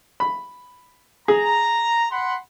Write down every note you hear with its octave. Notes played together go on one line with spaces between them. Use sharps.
B5
G#4 A#5
F#5 B5 C6